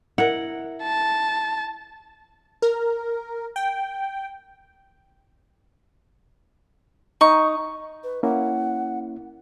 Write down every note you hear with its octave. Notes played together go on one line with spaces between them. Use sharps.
E4 A#4 F#5
A5
A#4
G5
D#4 C#6
B4
A#3 C#4 E4 F#5